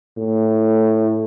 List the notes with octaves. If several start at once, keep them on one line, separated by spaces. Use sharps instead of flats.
A2